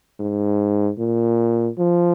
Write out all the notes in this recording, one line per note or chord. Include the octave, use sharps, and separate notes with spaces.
G#2
A#2
F3